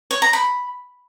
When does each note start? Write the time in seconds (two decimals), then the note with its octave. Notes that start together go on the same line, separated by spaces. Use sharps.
0.11 C#5
0.22 A#5
0.33 B5